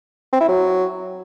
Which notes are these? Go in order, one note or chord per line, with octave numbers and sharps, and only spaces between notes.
C4
E4
F#3